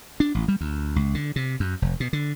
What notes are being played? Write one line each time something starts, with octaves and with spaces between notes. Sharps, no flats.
D4
A1
G3
D2
C#2
D3
C3
F#2
F1
B2
D3